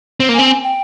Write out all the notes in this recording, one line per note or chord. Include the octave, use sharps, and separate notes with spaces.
C4
A#3
C4 G#5
G#5
G5